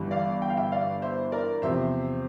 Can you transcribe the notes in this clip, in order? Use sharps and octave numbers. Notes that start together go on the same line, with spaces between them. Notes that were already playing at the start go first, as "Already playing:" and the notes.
Already playing: G1 G2 E3 G3
D5 F5
G5
F5
E5 G5
D5 F5
C5 E5
A#4 D5
E2 C3 F3 C5 E5